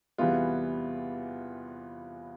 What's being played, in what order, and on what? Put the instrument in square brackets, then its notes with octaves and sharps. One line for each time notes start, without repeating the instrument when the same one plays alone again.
[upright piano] E2 C3 E3 G3 B3 F4